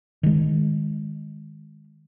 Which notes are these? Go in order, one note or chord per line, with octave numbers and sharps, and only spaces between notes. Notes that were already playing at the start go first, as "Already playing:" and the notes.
D#3 G#3